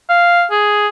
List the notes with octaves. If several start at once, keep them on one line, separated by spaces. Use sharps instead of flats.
F5
G#4